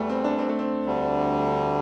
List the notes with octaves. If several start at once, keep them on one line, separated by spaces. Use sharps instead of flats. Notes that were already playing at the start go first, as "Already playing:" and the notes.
Already playing: E2 E3 G3 A3
C4
D4
C4
A3
C4
D2 D3 G3